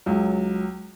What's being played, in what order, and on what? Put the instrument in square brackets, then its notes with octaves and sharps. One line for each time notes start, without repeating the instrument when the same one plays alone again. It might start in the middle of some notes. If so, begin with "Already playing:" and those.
[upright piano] C#2 F#3